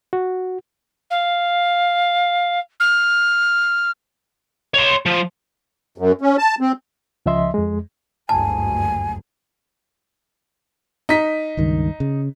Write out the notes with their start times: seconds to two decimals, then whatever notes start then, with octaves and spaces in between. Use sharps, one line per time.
0.13 F#4
1.10 F5
2.80 F6
4.74 C#5 C6
5.06 F3
5.98 F#2
6.21 C#4
6.38 A5
6.61 C4
7.26 C#2 F3 D#5 E5 C6
7.54 F2 G#3
8.29 F#1 D2 G2 G#5 A5
11.09 D#4 B6
11.57 C#2 G2 D#3
12.00 C#3